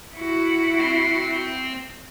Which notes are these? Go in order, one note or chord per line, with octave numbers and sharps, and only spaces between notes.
E4 F#4
C4